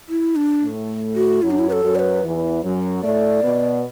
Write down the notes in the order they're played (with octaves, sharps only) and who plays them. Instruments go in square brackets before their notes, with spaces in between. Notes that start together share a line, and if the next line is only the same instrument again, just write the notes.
[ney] E4
D4
[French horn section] A2 A3
[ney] F#4
[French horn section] F#2 F#3 [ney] E4
[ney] D4
E4
B4
A4
[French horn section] F#2 F#3
[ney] D5
B4
[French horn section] E2 E3
F#2 F#3
[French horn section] A2 A3 [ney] D5
[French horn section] B2 B3